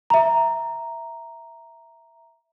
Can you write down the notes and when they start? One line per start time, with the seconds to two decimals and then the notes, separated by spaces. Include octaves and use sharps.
0.10 E5 A#5